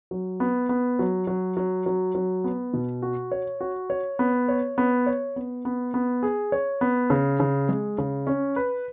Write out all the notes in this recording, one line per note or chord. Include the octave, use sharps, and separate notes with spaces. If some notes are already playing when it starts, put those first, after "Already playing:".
F#3
B3
B3
F#3
F#3
F#3
F#3
F#3
B3
B2
F#4
C#5
F#4
C#5
B3
C#5
B3
C#5
B3
B3
B3
G#4
C#5
B3
C#3
C#3
G#3
C#3
C#4
B4